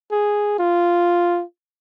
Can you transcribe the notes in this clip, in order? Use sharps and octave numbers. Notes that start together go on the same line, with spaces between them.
G#4
F4